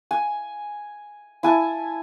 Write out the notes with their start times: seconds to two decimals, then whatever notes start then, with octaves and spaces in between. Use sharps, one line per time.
0.11 G#5
1.43 E4 G#5 A5